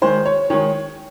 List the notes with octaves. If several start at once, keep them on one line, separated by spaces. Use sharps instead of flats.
D#3 G#3 C5
C#5
D#3 G#3 C#5